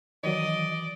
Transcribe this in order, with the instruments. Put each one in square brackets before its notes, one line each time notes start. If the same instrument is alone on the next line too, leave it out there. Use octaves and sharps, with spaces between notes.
[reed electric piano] D#3 F#3 [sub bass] E3 [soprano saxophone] D5 [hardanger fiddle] D#5